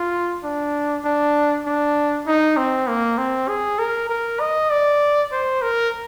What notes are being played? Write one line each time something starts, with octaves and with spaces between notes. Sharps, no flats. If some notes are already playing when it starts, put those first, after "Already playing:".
Already playing: F4
D4
D4
D4
D#4
C4
A#3
C4
G#4
A#4
A#4
D#5
D5
C5
A#4